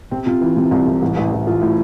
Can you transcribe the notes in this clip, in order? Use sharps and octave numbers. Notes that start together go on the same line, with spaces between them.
C3 C4
C3 F4
E3
C3
C2
C2
A1
A1
A1
A1 F4
A2